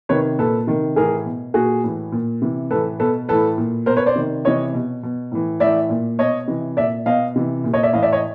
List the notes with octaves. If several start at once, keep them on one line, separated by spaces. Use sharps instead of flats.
C3 D#3 B4 C#5
A#2 A4 B4
C3 D#3
A2 E3 G#4 A#4
B2
A#2 F#4 G#4
A2 E3
A#2
C3 E3
A2 E3 A4 B4
B2 A4 B4
A2 E3 A4 B4
A#2
B2 A#4 C5
B4 C#5
C5 D5
C3 D#3
C3 E3 C#5 D#5
B2
B2
A2 E3
A2 E3 D5 E5
A#2
B2 C#5 D#5
C3 E3
A#2 D5 E5
B2 D#5 F5
C3 E3
A#2
C#5 D#5
D5 E5
A2 E3 D#5 F5
D5 E5
C#5 D#5